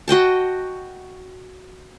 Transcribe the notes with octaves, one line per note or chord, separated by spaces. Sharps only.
F#4 D#5 G5 A5